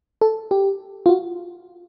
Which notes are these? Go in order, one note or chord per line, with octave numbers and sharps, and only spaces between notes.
A4
G4
F4
F#4